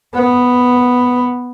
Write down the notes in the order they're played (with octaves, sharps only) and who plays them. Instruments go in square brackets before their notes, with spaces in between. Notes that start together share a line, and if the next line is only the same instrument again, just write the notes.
[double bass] B3